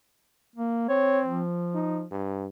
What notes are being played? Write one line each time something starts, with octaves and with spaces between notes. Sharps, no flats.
A#3
C4 C#5
F3
D#4
G2